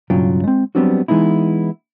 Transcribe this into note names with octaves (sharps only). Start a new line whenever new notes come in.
B1 G2 C#3 F#3 F4 G5
G#3 C4
F#3 G3 B3 C4 D4 F#4
E3 G#3 B3 D#4 E4